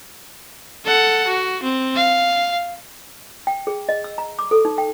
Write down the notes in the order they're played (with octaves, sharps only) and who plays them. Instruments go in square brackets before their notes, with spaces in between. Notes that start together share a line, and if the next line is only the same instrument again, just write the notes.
[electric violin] A4 F#5
F#4
C4
F5
[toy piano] G5
G#4
D#5
E6
A#5
D6
A4
D#4
G5